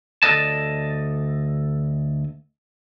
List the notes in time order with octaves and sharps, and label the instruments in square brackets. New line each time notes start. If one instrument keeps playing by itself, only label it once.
[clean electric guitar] D2 A4 B4 D5 D#5 A5